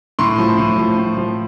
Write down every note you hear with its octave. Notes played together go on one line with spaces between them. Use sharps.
A2 C6
F3
A2
F3
A2
F3